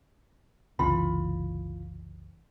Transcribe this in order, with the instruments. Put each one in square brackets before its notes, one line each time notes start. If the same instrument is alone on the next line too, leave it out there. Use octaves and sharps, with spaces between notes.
[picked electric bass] F#1 C2 E3 [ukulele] F4 B5